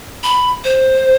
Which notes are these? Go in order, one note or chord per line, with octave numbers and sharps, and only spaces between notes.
B5
C5